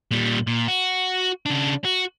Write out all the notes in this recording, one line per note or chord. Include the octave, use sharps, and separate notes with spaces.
A#2 G3
A#2
F#4
C#3 D4
F#4